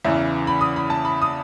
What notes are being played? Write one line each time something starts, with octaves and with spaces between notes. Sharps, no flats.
E2 C#3 E3 E5
B5
D#6
B5
A5
B5
D#6